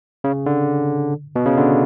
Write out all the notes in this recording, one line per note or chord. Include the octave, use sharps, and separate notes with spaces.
C#3
D3
B2
C#3
D3